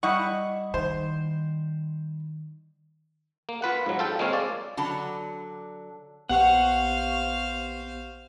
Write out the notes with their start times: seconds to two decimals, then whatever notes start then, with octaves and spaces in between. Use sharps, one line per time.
0.03 G3 E4 D#5 F#5 C#6
0.74 D#3 C5
3.49 A#3
3.62 F4 B4 F#5
3.86 G#2 F#3
3.99 F4 A4 G5
4.19 G#3 A#3 C4 C#5 F5
4.33 D5
4.77 D3 F#3 A5
6.29 A#1 B3 G4 C5 F5 F#5 C#6